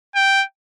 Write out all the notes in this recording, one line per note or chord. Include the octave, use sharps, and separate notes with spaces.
G5